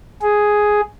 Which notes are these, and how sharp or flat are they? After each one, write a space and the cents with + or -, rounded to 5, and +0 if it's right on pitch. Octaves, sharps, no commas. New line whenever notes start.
G#4 +5